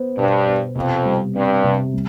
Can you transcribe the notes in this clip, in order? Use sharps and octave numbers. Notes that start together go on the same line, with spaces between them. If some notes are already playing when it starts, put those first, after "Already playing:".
Already playing: B3 C5
G2 B2
B3
F2 C3
G3
G2 C4
C3
G3